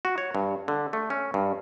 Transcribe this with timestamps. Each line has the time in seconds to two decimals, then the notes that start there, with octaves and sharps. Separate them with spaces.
0.05 F#4
0.18 C#5
0.35 G2
0.68 D3
0.93 A3
1.10 C#4
1.34 G2